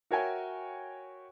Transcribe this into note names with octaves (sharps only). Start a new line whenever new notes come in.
F#4 A#4 C#5 E5 G5 G#5